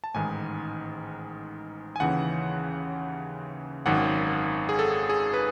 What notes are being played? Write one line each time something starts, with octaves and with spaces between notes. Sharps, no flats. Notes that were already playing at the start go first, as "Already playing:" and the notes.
A5
A1 G#2 D#3 G#5
G#5
D#2 C#3 E3 F#5
G#1 F#2 D#3 F#5
G#4
A4
G#4
B4